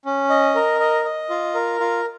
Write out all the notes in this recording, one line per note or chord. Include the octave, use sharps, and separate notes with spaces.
C#4
D#5
A#4
D#5
D#5
F4
A#4
F4